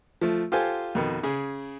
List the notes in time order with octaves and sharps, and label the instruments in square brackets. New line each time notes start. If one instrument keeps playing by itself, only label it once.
[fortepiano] F3 A3
F4 G4 A4 C5 G#5
F2 B2 D#3
C#3 G#4